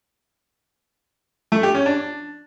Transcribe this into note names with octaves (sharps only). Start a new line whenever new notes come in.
A3
G4
C#4
D4